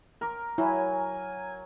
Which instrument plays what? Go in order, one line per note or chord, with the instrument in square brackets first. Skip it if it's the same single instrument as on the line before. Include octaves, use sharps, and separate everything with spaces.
[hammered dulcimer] A#4 D6
[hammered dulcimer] F#3 [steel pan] E4 [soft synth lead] G#5